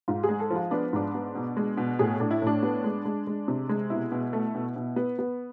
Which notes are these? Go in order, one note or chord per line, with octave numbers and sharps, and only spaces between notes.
G#2 F4
G#4
G#3
A4
F3
F4
B3 D4
G#2 D4
B3
B2
G#3
B2
A2 G#4
A2 D4
E4
A2 D4
B3
G#3
G#3
G#3
C3
G#3
B2 E4
B2
A3
B2
B2
B3
B3